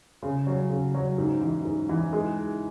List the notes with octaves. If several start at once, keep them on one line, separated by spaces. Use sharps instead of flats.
C#3
F#3
C#3
F#3
G#2
E3
G#2
E3
G#3